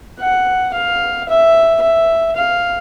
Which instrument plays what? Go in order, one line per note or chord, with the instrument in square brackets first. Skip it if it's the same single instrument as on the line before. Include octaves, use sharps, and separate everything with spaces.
[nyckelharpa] F#5
F5
E5
E5
F5